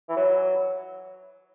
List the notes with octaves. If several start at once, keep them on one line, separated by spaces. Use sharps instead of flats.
E3
F#3